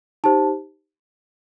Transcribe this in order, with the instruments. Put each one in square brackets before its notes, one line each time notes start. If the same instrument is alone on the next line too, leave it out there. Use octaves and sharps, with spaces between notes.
[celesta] D#4 G4 C5 A5